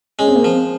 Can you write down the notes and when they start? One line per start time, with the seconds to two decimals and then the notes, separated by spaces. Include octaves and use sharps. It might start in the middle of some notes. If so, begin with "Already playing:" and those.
0.19 G#3 C#4
0.27 C4
0.35 A#3
0.42 F3 C4